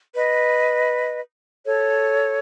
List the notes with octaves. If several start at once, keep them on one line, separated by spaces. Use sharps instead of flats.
B4 D#5
A4 C#5